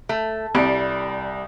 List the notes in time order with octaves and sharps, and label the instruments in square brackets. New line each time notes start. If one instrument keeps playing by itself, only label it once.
[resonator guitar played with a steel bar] A3
[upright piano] C2 [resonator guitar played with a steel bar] G3